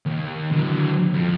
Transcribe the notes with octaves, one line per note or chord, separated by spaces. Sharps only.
D#2
D3 F#3
F2